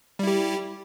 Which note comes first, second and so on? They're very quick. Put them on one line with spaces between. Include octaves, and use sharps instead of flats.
G3 E4 G4